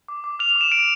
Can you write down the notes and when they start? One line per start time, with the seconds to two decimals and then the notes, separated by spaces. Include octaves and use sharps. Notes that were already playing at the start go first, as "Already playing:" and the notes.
0.08 D6
0.24 D6
0.39 F6 F7
0.51 F7
0.56 D6
0.61 E7
0.71 F6 D7